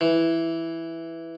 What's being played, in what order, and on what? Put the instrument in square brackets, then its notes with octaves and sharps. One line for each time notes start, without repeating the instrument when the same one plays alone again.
[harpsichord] E3